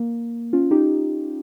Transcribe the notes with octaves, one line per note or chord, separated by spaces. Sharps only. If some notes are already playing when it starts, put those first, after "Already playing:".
Already playing: A#3
C#4 F4
D#4 G4